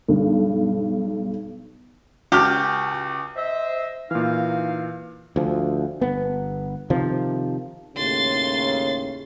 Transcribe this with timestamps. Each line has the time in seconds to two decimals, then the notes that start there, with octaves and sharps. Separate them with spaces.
0.08 B1 G2
2.32 C#2 F#4 G4 A5 F6
3.37 C5 D#5 E5
4.11 A#2 E3 D#4 F5
5.36 D2 F3
6.01 G1 B3
6.90 C3 D#3 F3
7.97 D#2 A2 C#3 C6 A6